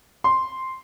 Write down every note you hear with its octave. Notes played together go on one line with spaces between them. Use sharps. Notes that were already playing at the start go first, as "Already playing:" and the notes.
C6